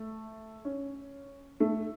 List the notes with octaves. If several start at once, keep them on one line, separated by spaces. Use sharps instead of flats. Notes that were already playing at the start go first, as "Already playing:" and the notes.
Already playing: A3
C#4
A3